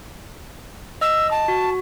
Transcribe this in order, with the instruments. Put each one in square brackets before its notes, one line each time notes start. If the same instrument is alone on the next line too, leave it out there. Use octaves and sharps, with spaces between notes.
[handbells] D#5 [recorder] E6
[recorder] A5
[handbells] F#4